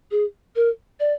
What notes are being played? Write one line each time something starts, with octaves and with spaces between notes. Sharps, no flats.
G#4
A#4
D5